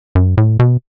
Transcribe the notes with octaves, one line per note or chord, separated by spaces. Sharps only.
F#2
A2
B2